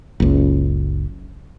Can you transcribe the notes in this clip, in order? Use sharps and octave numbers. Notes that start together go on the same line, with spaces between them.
F#1 C#2